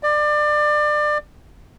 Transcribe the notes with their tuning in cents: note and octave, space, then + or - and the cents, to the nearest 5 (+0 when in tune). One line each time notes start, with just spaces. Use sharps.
D5 +25